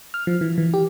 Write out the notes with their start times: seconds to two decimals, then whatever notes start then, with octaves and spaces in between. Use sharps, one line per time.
0.14 F6
0.27 F3
0.41 E3
0.58 E3
0.74 G4